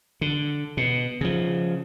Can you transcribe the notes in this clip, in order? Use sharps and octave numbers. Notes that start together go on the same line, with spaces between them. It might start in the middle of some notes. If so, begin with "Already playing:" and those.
D3
B2
C#3 F3